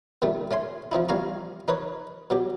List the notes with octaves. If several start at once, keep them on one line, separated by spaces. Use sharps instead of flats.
A#2 D#3 G3 A3
A3 C#4 G#5 C6
F3 C4 D#4 E4
A1 G3 F5 G#5 A#5 C#6
D#4 A#4 B4 C#5
B2 F#3 G4